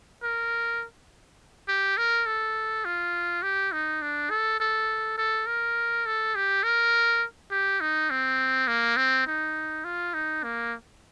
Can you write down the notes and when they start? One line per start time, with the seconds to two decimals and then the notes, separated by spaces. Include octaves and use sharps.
0.23 A#4
1.68 G4
1.97 A#4
2.26 A4
2.85 F4
3.43 G4
3.72 D#4
4.02 D4
4.30 A4
4.60 A4
5.18 A4
5.47 A#4
6.06 A4
6.35 G4
6.63 A#4
7.51 G4
7.81 D#4
8.10 C4
8.67 A#3
8.97 C4
9.27 D#4
9.84 F4
10.14 D#4
10.43 A#3